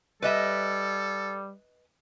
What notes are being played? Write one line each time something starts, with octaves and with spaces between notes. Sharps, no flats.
G3 A4 B4 D#5 E5